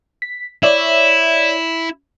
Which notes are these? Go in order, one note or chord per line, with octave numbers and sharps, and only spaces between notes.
B6
E4 C#5 D5 E5